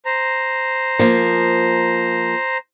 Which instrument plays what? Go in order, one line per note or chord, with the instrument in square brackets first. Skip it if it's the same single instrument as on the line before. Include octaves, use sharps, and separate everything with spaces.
[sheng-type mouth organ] C5 A#5
[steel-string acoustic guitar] F3 A#3